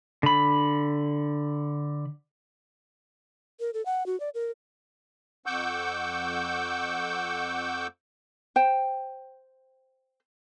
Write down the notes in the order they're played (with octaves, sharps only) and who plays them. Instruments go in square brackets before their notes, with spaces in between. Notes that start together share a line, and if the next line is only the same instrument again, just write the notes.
[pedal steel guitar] D3 B5
[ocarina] A#4
A4
F#5
F#4
D5
A#4
[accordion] F2 F#5 C#6 D6 E6 G6
[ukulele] C5 G5